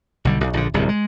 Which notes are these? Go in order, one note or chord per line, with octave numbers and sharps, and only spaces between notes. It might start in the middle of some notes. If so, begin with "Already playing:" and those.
B1 D3 G3
B1
A#1 D3
D1 C2 C3
G#3